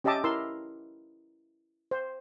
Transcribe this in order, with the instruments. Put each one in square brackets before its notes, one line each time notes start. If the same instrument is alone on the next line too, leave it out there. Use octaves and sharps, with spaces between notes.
[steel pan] C#4 G4 D#5 E5 A5 D6
E4 A#4 C6 E6
C5